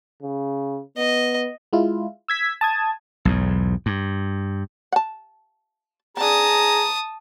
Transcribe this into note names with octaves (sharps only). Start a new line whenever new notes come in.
C#3
B3 D#5
G#3 E4 F4
E6 G#6 B6
A5 D#6 G#6
B1 E2 G#2
G2
F#5 A5
D3 C4 G#4 A5 A#5 D#6